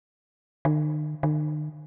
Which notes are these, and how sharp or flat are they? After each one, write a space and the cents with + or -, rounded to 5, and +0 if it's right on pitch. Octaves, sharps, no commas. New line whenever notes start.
D#3 -45
D#3 -45